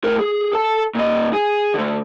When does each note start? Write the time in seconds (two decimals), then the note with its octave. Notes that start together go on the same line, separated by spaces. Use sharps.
0.04 A2 A#4
0.19 G#4
0.53 A4 A5
0.95 A#2 D#5
1.33 G#4
1.74 D3 A3